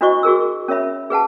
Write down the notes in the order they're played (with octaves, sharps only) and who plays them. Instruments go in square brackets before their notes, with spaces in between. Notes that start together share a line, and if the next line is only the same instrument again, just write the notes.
[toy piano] D4 E4 F#4 C5 D#5 C#6
F#4 G#4 A#4 E6
C#4 A#4 C#5 E5 B5
G#4 B4 F#5 A5